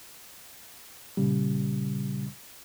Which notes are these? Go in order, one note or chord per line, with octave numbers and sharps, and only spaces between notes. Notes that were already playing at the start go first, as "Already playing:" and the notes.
A#2 C#3 G3